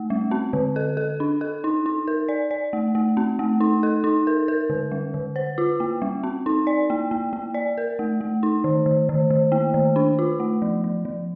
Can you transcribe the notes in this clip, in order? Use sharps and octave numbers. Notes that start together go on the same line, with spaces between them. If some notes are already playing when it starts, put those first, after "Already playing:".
Already playing: A3
G3
C4
D3
A4
A4
D4
A4
D#4
D#4
A#4
D5
D5
A3
A3
C4
A3
D#4
A4
D#4
A#4
A#4
D3
G3
D3
C5
F4
A#3
G3
C4
D#4
D5
A#3
A#3
A#3
D5
A#4
A3
A3
D#4
D#3
D#3
D#3
D#3
A#3
D#3
D4
F4
A3
F3
F3
F3